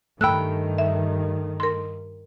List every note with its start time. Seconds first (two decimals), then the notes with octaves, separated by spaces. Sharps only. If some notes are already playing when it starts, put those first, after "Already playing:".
0.21 G2 D#3 A3 G5 B5 E6 F#6
0.78 E5
1.60 A#4 C6